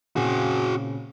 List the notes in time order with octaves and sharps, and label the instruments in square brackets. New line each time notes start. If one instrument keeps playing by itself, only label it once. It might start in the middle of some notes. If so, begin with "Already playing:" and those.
[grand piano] A#2 C#3 C4 [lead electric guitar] F#4 G#4